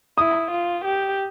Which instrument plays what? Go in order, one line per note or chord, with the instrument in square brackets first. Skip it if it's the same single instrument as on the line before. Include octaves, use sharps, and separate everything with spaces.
[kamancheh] E4 [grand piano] D#6
[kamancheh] F4
G4